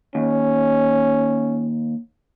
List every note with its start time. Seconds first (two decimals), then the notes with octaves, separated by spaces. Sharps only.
0.15 D#2 C#4